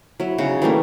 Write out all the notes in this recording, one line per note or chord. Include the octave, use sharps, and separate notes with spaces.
F#3 E4
C#3 D#4 F#4
E3 G3 A3 A#3